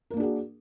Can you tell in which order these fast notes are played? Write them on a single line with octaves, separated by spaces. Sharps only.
A#4 A#3 D4 G#4 F#4